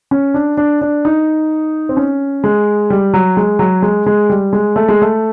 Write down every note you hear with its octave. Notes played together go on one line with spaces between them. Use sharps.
C#4
D4
D4
D4
D#4
C4
C#4
G#3
G3
F#3
G#3
F#3
G#3
G#3
G3
G#3
A3
G#3
A3